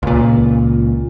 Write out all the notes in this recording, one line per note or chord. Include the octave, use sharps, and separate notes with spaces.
C#2 A#2